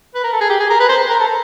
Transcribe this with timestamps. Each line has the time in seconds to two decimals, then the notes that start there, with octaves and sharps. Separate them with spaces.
0.15 B4
0.24 A#4
0.33 A4
0.41 G#4
0.50 G4
0.60 G#4
0.70 A#4
0.80 B4
0.89 C5
1.10 A#4
1.20 A4